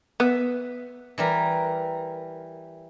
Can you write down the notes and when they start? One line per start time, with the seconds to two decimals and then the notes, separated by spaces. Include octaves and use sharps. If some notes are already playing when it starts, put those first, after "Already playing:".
0.20 B3 E5
1.18 E3 G3 A#4